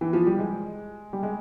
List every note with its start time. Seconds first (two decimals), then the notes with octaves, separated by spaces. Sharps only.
0.01 E3
0.13 F3
0.26 G3
0.39 G#3
1.13 G3
1.23 G#3